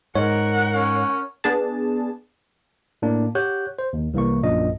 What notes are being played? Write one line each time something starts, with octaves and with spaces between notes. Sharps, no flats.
G#2 A#4 C#5 F#5
C#4
B3 D4 G#4 A5
A2 A#3 D4
G4 C#5 F#5 F#6 G6
C5
D#2
C2 E3 A#3 C#6
A#1 F#2 A#2 D4 D#5